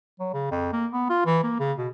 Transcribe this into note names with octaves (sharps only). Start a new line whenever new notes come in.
F#3
C#3
F2
A#3
B3
F4
E3
A#3
C#3
B2